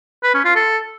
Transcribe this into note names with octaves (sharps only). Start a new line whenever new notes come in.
B4
C#4
F4
A4